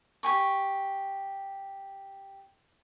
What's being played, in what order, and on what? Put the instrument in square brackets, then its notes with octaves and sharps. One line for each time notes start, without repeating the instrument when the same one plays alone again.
[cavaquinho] G4 G#5 C#6